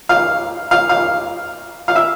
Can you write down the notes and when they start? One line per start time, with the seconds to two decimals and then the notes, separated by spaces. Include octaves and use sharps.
0.09 F5
0.71 F5
0.89 F5
1.88 F5
1.96 E5